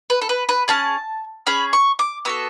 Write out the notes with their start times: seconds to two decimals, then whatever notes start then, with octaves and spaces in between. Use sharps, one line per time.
0.10 B4
0.21 A4
0.29 B4
0.49 B4
0.68 C#4 G#4 A5
1.47 C#4 G#4 B5
1.73 C#6
1.99 D6
2.25 B3 F#4 A4 E6